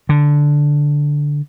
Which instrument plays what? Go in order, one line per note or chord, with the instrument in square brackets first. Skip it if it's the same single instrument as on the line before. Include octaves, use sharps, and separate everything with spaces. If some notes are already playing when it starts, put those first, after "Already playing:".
[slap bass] D3